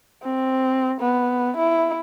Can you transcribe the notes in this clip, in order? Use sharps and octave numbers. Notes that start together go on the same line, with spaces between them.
C4
B3
E4